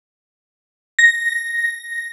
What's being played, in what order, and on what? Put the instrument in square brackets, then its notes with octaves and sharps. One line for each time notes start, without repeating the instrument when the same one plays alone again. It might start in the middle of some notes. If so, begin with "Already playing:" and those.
[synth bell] A#6